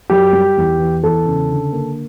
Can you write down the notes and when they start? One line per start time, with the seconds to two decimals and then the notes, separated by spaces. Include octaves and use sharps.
0.10 F#2 G4
0.33 G3
0.57 E2
0.79 E3
1.03 E2 A4
1.26 C#3
1.50 D3
1.72 A#3